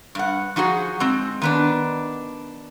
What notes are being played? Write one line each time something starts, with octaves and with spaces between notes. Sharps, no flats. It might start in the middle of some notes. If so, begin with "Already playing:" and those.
G2 F#5
F3 D#4 F#4 G#4
G#3 C4
D#3 B3 D4